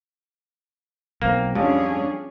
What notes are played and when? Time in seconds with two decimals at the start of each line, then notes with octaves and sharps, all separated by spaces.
1.22 B1 A#3 C4
1.55 F2 G3 C#4 D4 G#4